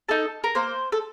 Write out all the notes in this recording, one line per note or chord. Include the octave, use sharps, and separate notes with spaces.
D#4 A4 A5
A#4
A#3 C5
A4